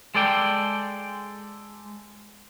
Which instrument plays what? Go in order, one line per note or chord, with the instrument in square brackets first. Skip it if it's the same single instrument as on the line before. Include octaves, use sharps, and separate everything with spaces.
[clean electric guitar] G#3 A4 D5 G5